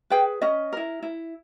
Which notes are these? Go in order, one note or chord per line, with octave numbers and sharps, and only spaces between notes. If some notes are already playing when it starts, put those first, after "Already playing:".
G#4 B4 G5
C#4 D#5
E4 A#4
E4